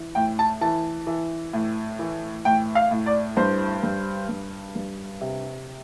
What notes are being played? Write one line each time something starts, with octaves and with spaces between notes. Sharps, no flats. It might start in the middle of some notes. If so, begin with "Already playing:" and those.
Already playing: E3
A2 G5
A5
E3 A5
E3
A2
E3
A2 G5
F5
A2
D5
G2 C5
G2
G2
G2
C3